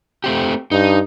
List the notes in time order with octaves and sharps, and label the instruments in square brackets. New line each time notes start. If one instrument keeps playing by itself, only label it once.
[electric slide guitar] A3 C4 G4
[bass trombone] G2 [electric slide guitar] D#4